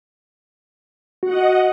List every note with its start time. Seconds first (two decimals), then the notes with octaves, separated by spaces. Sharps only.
1.23 F#4 D#5 F#5